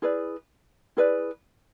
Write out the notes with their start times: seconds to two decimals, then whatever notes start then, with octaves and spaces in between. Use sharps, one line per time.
0.02 E4 G#4 B4 D5
0.97 E4 G#4 B4 D5